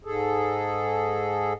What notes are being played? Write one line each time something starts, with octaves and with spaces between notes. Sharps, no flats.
G#2 G#4 A4